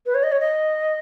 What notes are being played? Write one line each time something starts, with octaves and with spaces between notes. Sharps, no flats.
B4
C#5
D#5
C#5
D#5